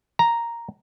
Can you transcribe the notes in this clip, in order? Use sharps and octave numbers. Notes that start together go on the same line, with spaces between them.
A#5